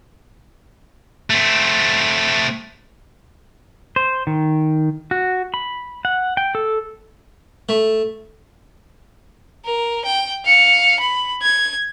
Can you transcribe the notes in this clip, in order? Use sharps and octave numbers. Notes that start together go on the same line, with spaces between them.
A3 C4
C5
D#3
F#4
B5
F#5
G5
A4
A3
A#4
G5
F5 C#7
B5
G#6